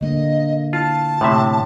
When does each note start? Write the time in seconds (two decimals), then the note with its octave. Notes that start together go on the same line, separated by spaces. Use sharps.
0.01 D3 A#3 D4 D#5
0.73 E4 F4 A5
1.21 A2 C3 E5